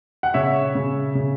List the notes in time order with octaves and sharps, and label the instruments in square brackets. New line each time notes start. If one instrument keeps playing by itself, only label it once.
[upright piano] F#5
C#3 C#5 E5
C#3
C#3